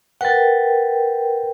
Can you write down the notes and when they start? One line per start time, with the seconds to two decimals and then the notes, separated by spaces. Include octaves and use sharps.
0.21 A#4 B4 F#5 G5 A6